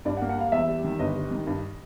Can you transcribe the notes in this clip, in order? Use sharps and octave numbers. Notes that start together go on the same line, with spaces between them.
G2 D5
F#5
A#3
F#5
G3 F5
E2 E5
G3
D#3
G1 D#5
G3
D#3
G2